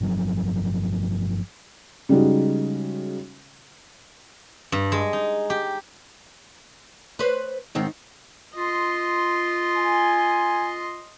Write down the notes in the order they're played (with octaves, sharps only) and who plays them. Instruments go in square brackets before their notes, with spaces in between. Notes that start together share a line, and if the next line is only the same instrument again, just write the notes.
[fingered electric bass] G1 F3 F#3
[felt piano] C#3 G3 G#3 D#4 F#4
[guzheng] G2
G#3
D#4
G4
[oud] B4 C5
G#2 D#3 C4
[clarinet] F4 [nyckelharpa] D#5 C6
[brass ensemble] G#5